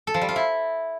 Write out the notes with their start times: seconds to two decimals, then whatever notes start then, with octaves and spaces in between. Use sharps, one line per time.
0.07 A4
0.14 F3
0.21 G3
0.29 F4
0.36 E4